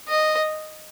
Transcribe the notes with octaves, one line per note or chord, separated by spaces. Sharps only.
D#5